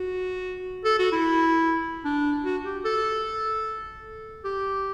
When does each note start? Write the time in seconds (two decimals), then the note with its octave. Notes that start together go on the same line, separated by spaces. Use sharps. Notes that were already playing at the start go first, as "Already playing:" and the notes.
Already playing: F#4
0.85 A4
0.99 F#4
1.12 E4
2.05 D4
2.44 F#4
2.64 G4
2.85 A4
4.44 G4